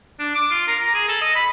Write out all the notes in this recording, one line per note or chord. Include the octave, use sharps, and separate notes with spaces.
D4
D6
F4
A#4
A#5
G#4
A4
D#5
B5